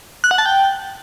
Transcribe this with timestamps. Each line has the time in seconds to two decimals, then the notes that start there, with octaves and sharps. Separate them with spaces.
0.24 F#6
0.31 F#5
0.38 A5
0.46 G5